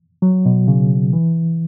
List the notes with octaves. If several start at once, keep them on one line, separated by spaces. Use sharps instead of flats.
F#3
B2
C#3
E3